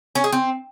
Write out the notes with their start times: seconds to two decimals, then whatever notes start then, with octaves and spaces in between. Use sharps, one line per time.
0.15 C#4
0.24 G#4
0.32 C4